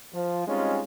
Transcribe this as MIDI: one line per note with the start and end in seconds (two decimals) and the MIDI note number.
0.14 0.47 53
0.48 0.81 55
0.48 0.81 56
0.48 0.81 60
0.48 0.81 61
0.48 0.81 63
0.48 0.81 65